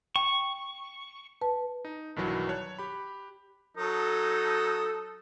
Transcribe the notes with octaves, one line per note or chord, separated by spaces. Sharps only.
G5 C#6
B4 A5
D#4
B1 G2 D#3 E3 F#3
C#5 A5 F#6
G4 B5
F#3 D#4 A4 D#6